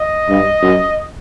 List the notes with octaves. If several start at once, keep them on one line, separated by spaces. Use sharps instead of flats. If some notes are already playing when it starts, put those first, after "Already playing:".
Already playing: D#5
G2
F#2